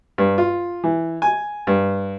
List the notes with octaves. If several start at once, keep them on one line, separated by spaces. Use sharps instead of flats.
G2
F4
E3
G#5
G2